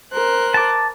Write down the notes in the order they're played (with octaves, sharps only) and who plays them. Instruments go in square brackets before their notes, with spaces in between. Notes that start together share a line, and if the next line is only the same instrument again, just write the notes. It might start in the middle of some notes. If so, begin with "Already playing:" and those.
[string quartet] A#4 C5 F#6
[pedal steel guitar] A5 D6